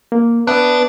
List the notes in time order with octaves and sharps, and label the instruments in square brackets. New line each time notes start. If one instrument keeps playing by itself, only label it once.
[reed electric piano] A#3
[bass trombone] B3 [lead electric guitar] D4 [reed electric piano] E5 F#6